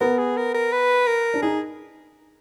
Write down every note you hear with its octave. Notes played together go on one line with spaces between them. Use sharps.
B3 A#4
G#4
A#4
A#4
B4
A#4
D4
D#4 G#4